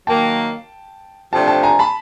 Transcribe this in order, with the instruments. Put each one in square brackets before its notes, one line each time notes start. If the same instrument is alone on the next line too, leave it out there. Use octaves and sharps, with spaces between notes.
[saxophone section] D#3 F#3 A#3 [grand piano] G5 A5
[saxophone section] C3 F3 A3 D4 [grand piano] G5 A5
[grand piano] G5 A5
G#5 A#5
A5 B5